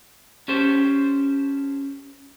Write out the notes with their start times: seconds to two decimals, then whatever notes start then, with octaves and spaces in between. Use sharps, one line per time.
0.48 C#4 G4 A4 C5